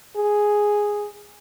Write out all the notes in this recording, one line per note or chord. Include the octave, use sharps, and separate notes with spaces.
G#4